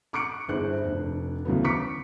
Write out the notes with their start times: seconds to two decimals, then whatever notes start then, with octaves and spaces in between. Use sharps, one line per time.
0.13 C#6 D6 F#6 C#7 D7
0.48 G1 D4 E4 G#4 C5 F#6
0.84 F1 D4
1.45 D2 C#3 E3 F#3 A3 B3
1.64 C#6 D6 B6 C#7